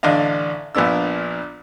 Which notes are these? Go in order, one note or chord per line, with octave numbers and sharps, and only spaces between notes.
A1 D3 D4 D#5 F5
A#1 A#2 B3 D4 E6